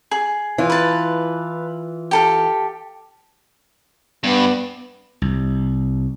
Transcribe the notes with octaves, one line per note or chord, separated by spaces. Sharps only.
G#4
E3 F4
B4 A5
G4 A4 F5
G2 B3
C2